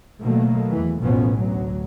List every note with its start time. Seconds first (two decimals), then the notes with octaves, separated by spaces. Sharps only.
0.21 B2 D#3 F#3 A3 A#3
0.72 E2 E3
1.03 A1 F2 B2 F3 B3 C#4
1.34 D2 F#3